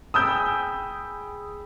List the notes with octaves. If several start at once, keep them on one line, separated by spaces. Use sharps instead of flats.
G#4 G5 B5 D#6 E6 G6